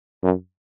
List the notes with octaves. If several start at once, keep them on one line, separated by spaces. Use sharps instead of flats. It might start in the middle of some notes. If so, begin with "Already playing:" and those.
F#2